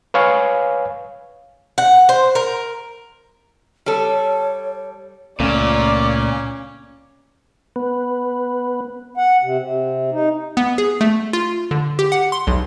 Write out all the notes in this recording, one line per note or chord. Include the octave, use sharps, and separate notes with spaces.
B4 C#5 F5 G#5
F#5
C5
A#4
G3 A4 C#5
C#2 A#2 A3 C#4 D5 D6
B3
F#5
C3
C3
D#4
B3
G#4
A3
F4
D3
G4
F#5
C6
B1